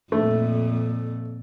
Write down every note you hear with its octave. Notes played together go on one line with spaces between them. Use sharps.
F2 A#2 A3